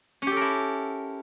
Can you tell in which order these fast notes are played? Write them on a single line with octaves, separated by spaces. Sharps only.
C#4 G4 A4 A#4 E4